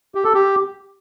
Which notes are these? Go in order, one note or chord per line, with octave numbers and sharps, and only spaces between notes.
G4
A4
G4